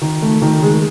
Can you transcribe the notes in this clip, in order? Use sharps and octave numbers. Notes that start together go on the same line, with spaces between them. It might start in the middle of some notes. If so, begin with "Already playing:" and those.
D#3
A3
D#3
G#3